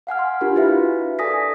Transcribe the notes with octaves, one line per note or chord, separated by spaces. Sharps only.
F5 F#5 G#5 F6
C6
D4 F4 G4 A#4
E4 F#4 B4 E5 F5
A4 D5 G#5 D#6 A#6 B6